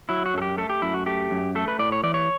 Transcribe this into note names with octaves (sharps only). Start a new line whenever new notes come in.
F#3 E4
F#4
F#2 A4
G4
A3 A4
G4
F#2 E4
F#4
A3 G4
F#2
A3 A4
B4
A2 D5
C#5
E3 D5
C#5